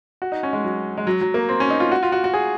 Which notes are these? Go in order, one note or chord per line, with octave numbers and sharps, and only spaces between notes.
F#4
D#4
C#4
G#3
F#3
G#3
F#3
F#3
A#3
C4
C#4
D#4
F4
F#4
F4
F#4
F#4
G#4